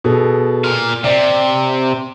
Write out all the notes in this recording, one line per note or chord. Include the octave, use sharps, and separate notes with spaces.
B2 G#4 A4
A#2 F5
C3 D5